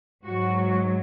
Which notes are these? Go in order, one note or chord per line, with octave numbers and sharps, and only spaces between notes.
G#2 F#3 F#4